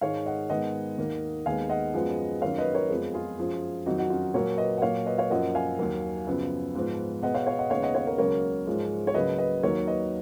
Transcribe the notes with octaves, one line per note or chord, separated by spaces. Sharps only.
G#2 D#3 G#3 C#5 F5
D#5 F#5
G#2 D#3 G#3 B3 D#5 F#5
D#2 D#3 A#3
D#2 D#3 G#3 B3 F5 G#5
D#5 F#5
F#2 F3 G#3 B3
F#2 D#3 F#3 A#3 C#5 F5
B4 D#5
A#4 C#5
F2 F3 G#3 B3 G#4 B4
F4 G#4
F#2 F3 G#3
F2 D#3 F#3 D#4 F#4
D#4 F#4
C#4 F4
A#2 F#3 A#3 A#4 C#5
B4 D#5
F#5
A#2 F#3 A#3 C#5 F5
B4 D#5
C#5 F5
F#2 F3 A#3 D#5 F#5
F5 G#5
D#2 D#3 F#3 A#3
F#2 C#3 F3 B3
G#2 F3 B3
B2 G#3 B3 D#5 F#5
C#5 F5
C#5 F5
D#5 F#5
D#2 C#3 G#3 B3 C#5 F5
D#5 F#5
C#5 F5
A#4 C#5
C#2 C#3 F#3 A#3 A#4 C#5
G#2 F3 G#3
C#5
C#2 C#3 F#3 A#3 B4 D#5
B4 D#5
D#2 D#3 F#3 A#3 A#4 C#5
B4 D#5